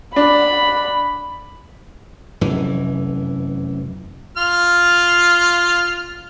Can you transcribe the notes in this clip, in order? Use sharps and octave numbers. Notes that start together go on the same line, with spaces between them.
D4 B5
F1 F#2 E3
F4 F6